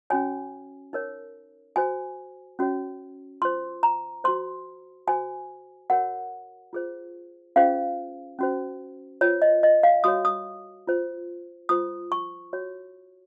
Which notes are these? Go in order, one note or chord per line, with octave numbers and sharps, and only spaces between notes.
C#4 F#4 C#5 G#5
D#4 A#4 C#5
F#4 C5 G#5
C#4 F#4 C#5
F4 C5 C6
A#5
F#4 C5 C6
F#4 C5 G#5
F#4 A#4 C#5 F#5
F4 G#4 C5
C#4 F4 G#4 C5 F5
C#4 F#4 C5
F4 C5 C#5
D#5
D#5
F5
F#4 C#5 D#6
D#6
F4 C5
F4 C5 D#6
C#6
F#4 C#5